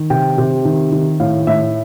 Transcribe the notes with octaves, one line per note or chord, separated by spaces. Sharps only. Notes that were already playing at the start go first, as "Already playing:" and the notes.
Already playing: D#3
C3 G5
C3
D#3
D#3
A2 F5
A2 E5